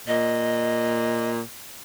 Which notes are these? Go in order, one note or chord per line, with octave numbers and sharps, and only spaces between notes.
A#2 D#5